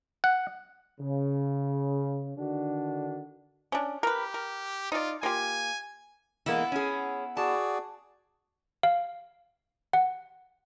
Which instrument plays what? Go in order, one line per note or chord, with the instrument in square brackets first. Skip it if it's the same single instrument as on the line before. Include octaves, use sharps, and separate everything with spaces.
[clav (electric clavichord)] F#5
[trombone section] C#3
D3 D#3 D4 F#4
[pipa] C#4 D4
[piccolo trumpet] G4 [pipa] A#4 B4
[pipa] A#4
[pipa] D#4 D5 [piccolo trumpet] F4
[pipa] A#3 F4 G4 [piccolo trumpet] G#5
[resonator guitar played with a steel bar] E3 G#3 A#3 [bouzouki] B3 E4
[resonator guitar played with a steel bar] C#4 G#4
[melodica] F#4 G#4 D5 [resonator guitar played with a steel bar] A5
[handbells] F5
F#5